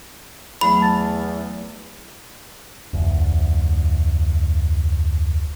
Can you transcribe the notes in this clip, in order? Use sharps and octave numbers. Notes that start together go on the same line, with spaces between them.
E2 F#3 A3 B5
A5 A6
F1 D2